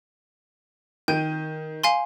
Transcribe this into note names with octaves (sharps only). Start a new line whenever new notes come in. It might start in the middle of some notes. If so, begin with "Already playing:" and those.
D#3 G5 G6 D#7
F5 G#5 C6